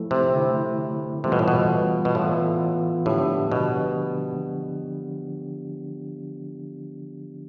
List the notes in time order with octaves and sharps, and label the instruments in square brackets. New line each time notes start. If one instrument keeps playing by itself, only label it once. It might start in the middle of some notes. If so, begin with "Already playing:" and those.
Already playing: [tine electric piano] F3 A3 E4 A4
[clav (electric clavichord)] C3
[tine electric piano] D3 A3 E4
[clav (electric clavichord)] C3 [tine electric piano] E3 G3 B3 F4 A4
[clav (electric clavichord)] B2
A2
B2
B2
[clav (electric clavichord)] A2 [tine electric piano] E3 B3 F4 A4
[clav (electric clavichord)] A2 [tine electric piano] D3 F3 B3 D4 G4
[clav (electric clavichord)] B2